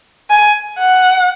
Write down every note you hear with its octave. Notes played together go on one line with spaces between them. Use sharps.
G#5
F#5